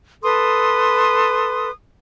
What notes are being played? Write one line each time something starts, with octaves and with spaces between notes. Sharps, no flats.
A4 B4 C6 D#6